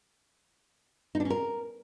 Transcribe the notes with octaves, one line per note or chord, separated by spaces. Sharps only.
D#4
D4
C#4
A#4